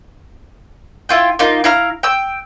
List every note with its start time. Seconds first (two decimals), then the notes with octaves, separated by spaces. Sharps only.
1.09 E4 F4 G5
1.39 A#3 D#4 F4
1.64 E4 F5 A#5 F6
2.03 G5 E6